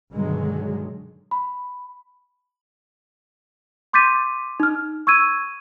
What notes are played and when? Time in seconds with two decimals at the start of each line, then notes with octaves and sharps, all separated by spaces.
0.13 G2 B2 D3 D#3 F#3 G#3
1.31 B5
3.93 C6 D6 G6 A6 B6 D#7
4.60 D#4 F6
5.07 C#6 E6 G#6 D#7